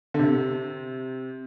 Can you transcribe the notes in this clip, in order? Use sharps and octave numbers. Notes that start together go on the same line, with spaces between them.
D3
C3